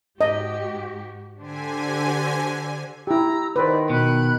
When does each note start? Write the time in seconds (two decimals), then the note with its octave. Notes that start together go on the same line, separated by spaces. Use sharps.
0.21 G#2 F#4 G4 D#5
1.38 D3 D4 G4 C5 G#5
3.07 E4 G4 A#5 E6
3.56 D#3 B4 C5 D5 D#5
3.90 B2 B5 F#6